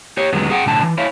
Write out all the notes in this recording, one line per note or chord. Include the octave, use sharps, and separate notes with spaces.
G4 C#5
D#2 D3 F#3 G#3 B3
G#4 F#5 G5
B1 A2 D3 A5
E3
E4 C#5 F5